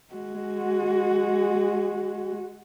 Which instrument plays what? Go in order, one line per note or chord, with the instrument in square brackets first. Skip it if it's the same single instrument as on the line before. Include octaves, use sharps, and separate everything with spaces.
[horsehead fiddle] G#3 F#4